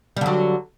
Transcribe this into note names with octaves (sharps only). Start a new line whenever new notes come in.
D3 F#3 G3